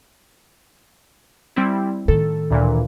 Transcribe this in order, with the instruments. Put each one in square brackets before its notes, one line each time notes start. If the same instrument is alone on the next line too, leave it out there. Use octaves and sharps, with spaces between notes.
[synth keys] G3 C4 E4
[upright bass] A2 D#3 [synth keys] A4
[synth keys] D2 A#2 E3